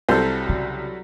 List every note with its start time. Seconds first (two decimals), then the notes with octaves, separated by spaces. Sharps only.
0.09 C2 F#3 G3 A4 C5
0.49 C#3